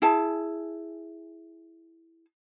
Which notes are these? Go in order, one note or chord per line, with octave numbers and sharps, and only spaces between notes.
E4 G#4 A5